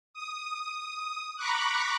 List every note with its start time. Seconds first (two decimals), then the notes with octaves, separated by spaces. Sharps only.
0.14 D#6
1.36 A#5 B5 C#6 D6 F#6